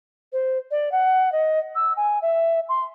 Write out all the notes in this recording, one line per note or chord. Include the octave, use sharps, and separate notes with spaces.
C5
D5
F#5
D#5
E6
G#5
E5
C6